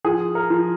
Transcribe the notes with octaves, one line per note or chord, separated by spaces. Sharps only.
F3 G#4
A#4
F3